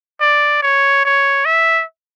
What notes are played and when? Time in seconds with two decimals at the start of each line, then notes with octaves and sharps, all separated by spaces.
0.21 D5
0.62 C#5
1.05 C#5
1.46 E5